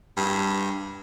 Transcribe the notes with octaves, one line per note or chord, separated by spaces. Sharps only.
G2